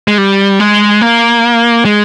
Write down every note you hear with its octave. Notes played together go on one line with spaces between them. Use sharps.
G#3
G3
G#3
A#3
G#3